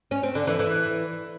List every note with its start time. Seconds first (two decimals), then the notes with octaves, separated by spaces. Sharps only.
0.11 C#4
0.23 C4
0.35 D3
0.47 E3
0.59 E3